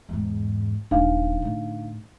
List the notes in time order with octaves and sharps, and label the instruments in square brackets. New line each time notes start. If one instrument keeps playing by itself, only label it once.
[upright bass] E2 G#2
[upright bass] D#1 F#3 [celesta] D4 D#4 F5
[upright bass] A2 D3